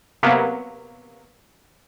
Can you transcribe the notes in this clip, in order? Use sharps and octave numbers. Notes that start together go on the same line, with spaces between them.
C3 F#3 A#3 B3